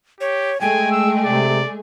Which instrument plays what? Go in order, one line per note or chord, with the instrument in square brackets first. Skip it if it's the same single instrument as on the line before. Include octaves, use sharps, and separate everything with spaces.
[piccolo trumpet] G4 [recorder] C#5
[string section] G#3 A3 G#4 [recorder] G5 [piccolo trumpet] G#5
[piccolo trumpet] E6
[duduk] C3 [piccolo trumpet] D5